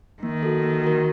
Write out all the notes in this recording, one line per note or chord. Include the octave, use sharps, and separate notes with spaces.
D#3 A#3
F#4 A4
A#3
F#4 A#4